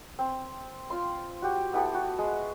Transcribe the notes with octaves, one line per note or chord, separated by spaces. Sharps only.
C4
F4 G5 C6
F#4 G4
B3 E4 G4 A4
F#4
G#3